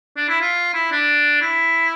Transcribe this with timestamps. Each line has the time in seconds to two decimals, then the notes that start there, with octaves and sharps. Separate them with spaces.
0.17 D4
0.29 E4
0.41 F4
0.74 E4
0.91 D4
1.41 E4